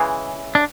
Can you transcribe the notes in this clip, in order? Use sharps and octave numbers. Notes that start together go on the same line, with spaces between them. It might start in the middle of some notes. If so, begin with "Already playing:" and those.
Already playing: C#3 E3 G#3
D4